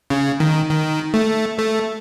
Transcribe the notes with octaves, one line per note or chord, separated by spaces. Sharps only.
C#3
D#3
D#3
A3
A3